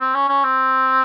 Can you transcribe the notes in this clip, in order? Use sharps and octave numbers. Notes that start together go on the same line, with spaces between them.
C4
C#4
C#4
C4